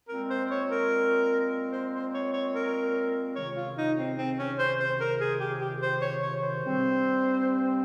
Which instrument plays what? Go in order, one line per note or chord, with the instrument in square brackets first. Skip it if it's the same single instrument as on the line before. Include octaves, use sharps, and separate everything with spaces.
[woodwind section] A#2 G#3 C4 [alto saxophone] A#4
[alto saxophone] C5
C#5
A#4
C5
C5
C#5
C#5
A#4
[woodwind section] C#2 C3 D#3 [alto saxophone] C#5
[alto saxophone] F4
D#4
C4
C4
C#4
C5
C5
A#4
G#4
G4
G4
C5
C#5
C#5
C5
[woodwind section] G2 G3 C4